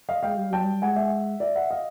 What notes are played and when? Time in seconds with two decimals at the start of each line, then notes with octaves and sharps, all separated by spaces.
0.09 D#5 F5
0.23 G#3 F5 G5
0.37 G3
0.50 F#3 G5 A5
0.63 G3
0.82 G#3 F#5 G#5
0.96 E5 F#5
1.40 D5 E5
1.55 E5 F#5
1.70 D#5 F5